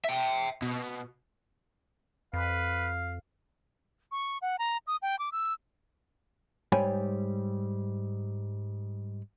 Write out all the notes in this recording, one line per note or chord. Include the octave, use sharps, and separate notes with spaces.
E5 G5
B2
F2 B4 F5
C#6
F#5
A#5
D#6
G5
D6
E6
G#2 G3 C#5 G5 G#5 B5